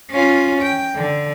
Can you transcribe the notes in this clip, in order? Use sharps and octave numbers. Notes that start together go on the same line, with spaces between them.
C#4 F4
G5
D3